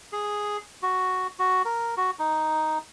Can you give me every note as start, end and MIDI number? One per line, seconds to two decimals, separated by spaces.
0.12 0.57 68
0.82 1.27 66
1.39 1.62 66
1.65 1.95 70
1.97 2.11 66
2.19 2.78 63